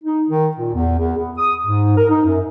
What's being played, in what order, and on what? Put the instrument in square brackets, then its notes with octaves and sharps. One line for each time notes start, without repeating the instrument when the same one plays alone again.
[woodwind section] D#4
D#3
A#2
E2
E2
B3
D#6
G#2
A#4
D#4
F#2